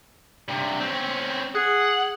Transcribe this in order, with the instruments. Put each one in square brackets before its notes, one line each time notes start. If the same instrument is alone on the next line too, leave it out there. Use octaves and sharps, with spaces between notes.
[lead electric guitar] G2 C3
C4 C#4
[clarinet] G#4 [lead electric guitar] F#5